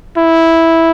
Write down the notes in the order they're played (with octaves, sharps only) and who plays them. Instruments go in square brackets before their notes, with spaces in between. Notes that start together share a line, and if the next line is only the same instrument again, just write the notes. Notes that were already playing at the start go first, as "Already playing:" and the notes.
[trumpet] E4